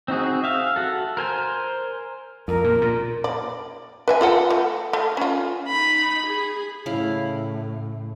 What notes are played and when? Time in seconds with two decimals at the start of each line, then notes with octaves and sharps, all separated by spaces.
0.08 C4 D#4 F#4 G#4
0.44 E5 F5
0.76 F#4 A4
1.17 A#4 C5 G#5
2.48 F2 A#4
2.64 A#2
2.81 A#2
3.24 D5
4.08 B4 E5 G#5
4.21 F4 A4 F#5
4.50 A3
4.93 A3
5.17 C#4 F4
5.68 D#4 B5
6.26 G#4
6.86 A2 C#3 E4 F5